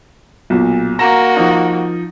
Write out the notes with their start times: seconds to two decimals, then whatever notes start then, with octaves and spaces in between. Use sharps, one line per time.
0.50 B1 A#2
0.99 A#3 F#4 A#5 A#6 E7
1.36 F3 D#4